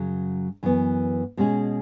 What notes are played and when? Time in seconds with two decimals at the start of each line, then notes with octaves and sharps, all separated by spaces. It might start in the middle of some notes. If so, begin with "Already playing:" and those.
Already playing: F#2 C#3 F#3
0.63 F#2 E3 B3
1.37 B2 G#3 C#4 G#4